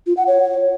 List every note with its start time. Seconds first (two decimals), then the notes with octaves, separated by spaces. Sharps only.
0.07 F4
0.17 F#5
0.27 C#5